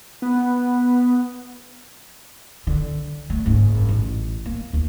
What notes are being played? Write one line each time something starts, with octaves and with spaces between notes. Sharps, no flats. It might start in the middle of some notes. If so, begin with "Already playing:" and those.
B3
D3
A3
F#1 G#2
A1
A#3
D#2